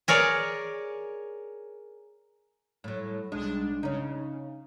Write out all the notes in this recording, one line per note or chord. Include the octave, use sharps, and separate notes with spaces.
G#4 A#4 C#5 D5
A2 F#3
B1 G#3 D4
C#3 C#4 D#4